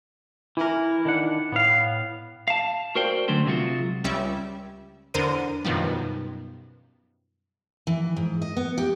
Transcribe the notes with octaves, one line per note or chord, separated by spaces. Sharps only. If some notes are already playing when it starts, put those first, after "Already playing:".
E3 E4 A#4
D#3 D4 F#5
A2 B3 F5
F5 A5
F#4 A#4 C5 D5 G5
D3 F#3 A3 C#4 C5
C3 F#3 G#3 F4 F#4
C#2 G3 C#4 E5
E2 D3 A#4 C5 D#7
F#2 B2 D#3 F3 G3
E3
G#2
D#5
B3
G4